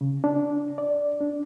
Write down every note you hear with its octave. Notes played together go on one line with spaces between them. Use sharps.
C#3
D4
D5
D4